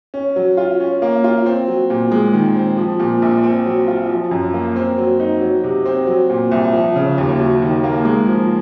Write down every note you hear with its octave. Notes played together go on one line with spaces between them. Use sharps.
C#4
F#3
F4
C#4
A#3
F4
C4
F#3
A#2
G#3
D#3
C4
F3
A#2
A#1
C4
F#3
F4
F3
F#2
A#3
C4
F#3
D#4
F#3
C3
C4
F#3
A#2
C2
F3
C#3
D#2
F#3
D#3
A#3
G#3
F3